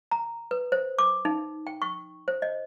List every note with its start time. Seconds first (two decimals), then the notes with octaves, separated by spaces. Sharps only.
0.11 A#5
0.51 B4
0.72 C5
0.99 D6
1.25 D#4
1.67 G5
1.82 C#6
2.28 C5
2.42 D#5